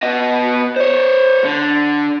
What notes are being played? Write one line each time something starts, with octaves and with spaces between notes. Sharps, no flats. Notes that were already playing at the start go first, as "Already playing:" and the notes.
B3 D#5
C5 C#5
D3